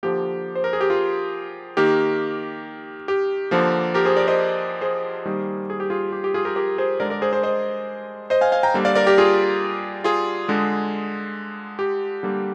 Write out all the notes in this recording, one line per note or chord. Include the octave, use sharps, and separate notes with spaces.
D3 F3 A#3 G4
C5
A#4
G#4
G4
F4
D#3 A#3 G4
G4
D3 F3 A#3
G4 A#4
G#4 C5
A#4 D5
C5 D#5
G#4 C5
D#3 G3 A#3
G#4
G4
F4 G#4
G4
G4
F4 G#4
G4 A#4
G4 A#4
G#4 C5
D3 G#3 A#4 D5
A#4 D5
G#4 C5
G#4 C5
C5 D#5
C5 D#5
F5 G#5
F5 G#5
G5 A#5
D3 G3 A#3
D5 F5
A#4 D5
G4 A#4
F4 G#4
F4 G#4
D3 G#3
G4
D3 G3 A#3